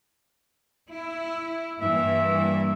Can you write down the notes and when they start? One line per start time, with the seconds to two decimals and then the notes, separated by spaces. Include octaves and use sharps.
0.89 E4
1.81 G2 E3 A#3 E5